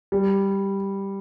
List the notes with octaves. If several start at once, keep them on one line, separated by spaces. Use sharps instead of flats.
G3